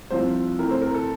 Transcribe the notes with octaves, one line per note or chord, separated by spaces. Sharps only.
C2 C3 F3 C5
D2 C3 E3 A#4
C5
A#4
A4